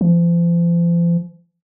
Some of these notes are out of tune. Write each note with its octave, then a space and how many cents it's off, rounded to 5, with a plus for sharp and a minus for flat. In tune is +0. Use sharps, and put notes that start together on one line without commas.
F3 -40